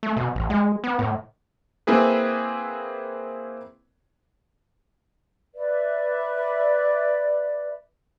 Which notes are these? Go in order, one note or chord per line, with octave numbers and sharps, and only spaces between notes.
A3
B2
A1
G#3
B3
A2
A#3 C4 E4 G#4 B4
B4 D5 E5